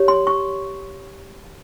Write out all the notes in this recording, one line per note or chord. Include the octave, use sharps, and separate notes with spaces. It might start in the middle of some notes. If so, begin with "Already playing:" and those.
Already playing: G4 C#5
C6
C#6